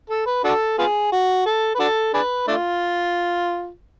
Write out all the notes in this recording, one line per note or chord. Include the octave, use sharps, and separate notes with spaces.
A4
B4
D4 F#4 A4
B3 F4 G#4
F#4
A4
B4
D4 F#4 A4
D4 G#4 B4
A3 D4 F4